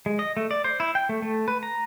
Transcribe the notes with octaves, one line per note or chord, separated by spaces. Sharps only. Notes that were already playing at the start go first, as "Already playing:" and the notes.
G#3
D#5
A3
D5
C5
E4
G5
A3
A3
B4
A#5